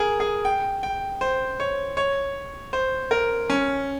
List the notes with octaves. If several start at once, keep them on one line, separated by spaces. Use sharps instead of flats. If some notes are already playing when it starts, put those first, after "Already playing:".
Already playing: G#4 A#4
G#4
G5
G5
C5
C#5
C#5
C5
A#4
C#4